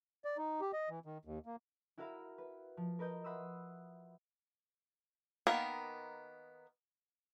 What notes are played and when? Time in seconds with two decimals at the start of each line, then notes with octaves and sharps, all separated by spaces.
0.25 D5
0.37 D#4
0.61 G4
0.73 D#5
0.89 E3
1.06 D#3
1.25 D#2
1.46 A#3
1.98 E4 F#4 A#4 E5 F5 B5
2.38 B4
2.77 F3
2.99 A#4 B4 D#5 G6
3.24 E5 F#5 B5 C6 D#6 E6
5.47 D#3 A#3 B3 A#4